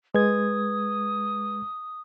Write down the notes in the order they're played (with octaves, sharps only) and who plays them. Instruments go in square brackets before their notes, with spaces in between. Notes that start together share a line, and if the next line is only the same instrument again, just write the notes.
[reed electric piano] G#3 G#6 [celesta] B4 [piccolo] D#6